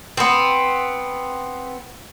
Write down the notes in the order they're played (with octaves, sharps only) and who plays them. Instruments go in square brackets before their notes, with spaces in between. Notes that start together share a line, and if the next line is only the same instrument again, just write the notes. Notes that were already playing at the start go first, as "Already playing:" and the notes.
[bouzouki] B3 C4